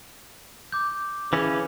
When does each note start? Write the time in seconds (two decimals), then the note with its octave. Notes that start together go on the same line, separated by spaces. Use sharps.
0.72 D6 G6
1.33 C#3 E3 C#4